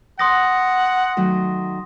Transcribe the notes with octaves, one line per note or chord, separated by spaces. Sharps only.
F#5 C6 D#6 A#6
D#3 F#3 A3